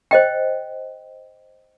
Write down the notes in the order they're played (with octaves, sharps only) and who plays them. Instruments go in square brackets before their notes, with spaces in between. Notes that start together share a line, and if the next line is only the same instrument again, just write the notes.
[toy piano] C5 D#5 G5